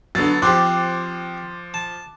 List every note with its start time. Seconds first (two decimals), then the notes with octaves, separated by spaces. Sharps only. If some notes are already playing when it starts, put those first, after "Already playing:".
0.15 D3 F#3 B3 A6
0.42 F3 C4 G4 C6 D6 F#6
1.74 A5